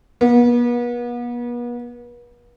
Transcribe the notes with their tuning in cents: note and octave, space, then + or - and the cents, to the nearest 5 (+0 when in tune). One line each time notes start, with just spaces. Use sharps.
B3 -40